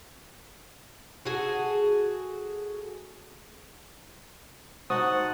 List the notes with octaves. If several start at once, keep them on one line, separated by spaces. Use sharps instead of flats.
F#4 G#4 A4
D#4 F#4 C5 F#5 A5 D#6